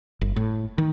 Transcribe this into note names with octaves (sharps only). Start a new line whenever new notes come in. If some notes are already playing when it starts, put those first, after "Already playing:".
G1
A2
D#3